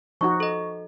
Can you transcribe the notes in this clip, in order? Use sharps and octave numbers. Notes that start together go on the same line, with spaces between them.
F3 D#4 F#4 C#6
A4 D#5